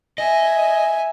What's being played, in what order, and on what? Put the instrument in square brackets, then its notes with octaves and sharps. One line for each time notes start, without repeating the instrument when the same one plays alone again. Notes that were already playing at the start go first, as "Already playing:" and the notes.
[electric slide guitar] D#5 [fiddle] E5 G#5